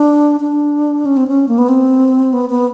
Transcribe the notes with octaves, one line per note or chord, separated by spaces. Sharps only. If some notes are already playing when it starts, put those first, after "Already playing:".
Already playing: D4
D4
C#4
C4
C#4
A#3
B3
C4
B3
B3